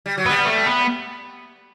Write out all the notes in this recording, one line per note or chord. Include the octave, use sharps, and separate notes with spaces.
G3
F#3
G3 B3
A3
B3